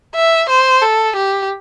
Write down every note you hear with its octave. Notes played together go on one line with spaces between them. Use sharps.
E5
C5
A4
G4